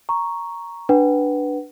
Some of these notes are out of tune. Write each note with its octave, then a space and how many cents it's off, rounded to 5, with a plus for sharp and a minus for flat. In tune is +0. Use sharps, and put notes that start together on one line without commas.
A#5 +0 C#6 +0
D4 +0 B4 +0 F#5 +30